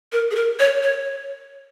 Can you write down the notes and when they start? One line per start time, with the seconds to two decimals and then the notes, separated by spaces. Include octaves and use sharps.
0.13 A#4
0.31 G#4
0.35 A#4
0.59 C#5
0.83 C#5